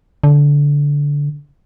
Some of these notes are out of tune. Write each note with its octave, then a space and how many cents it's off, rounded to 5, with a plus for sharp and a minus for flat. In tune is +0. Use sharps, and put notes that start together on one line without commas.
D3 -20